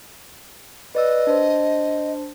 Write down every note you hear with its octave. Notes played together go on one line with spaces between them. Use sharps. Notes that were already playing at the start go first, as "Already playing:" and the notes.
B4 D5 D#5 E6
D4 C5